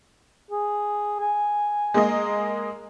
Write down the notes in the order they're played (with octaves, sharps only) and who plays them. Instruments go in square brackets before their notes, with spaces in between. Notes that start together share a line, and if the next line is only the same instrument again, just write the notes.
[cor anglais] G#4
G#5
[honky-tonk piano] G#3 A#3 D#5